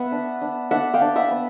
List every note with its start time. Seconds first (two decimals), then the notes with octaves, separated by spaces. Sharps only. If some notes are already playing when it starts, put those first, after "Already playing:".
Already playing: B3 E5 F#5
0.12 D4
0.42 D4
0.71 D4 E5 F#5
0.94 F5 G5
1.01 D4
1.16 E5 F#5
1.31 B3